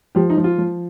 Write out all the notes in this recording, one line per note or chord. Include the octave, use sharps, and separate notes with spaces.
F3 G4
D#4
F3
F4
F3